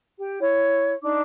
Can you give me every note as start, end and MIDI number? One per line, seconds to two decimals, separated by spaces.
0.18 0.38 67
0.40 0.92 64
0.40 0.92 73
1.03 1.21 62
1.03 1.21 63
1.03 1.21 86